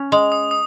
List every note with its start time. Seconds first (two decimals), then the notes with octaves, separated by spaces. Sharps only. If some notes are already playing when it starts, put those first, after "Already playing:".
Already playing: C#4
0.12 G#3 D#6
0.32 D#6
0.51 D#6